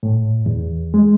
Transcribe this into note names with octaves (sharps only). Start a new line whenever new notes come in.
A2
E2
G#3